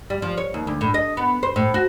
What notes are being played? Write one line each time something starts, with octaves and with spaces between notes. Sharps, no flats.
G3
F3
C#5
D#2
D2
A2
D#5
B3
C5
A2
F#4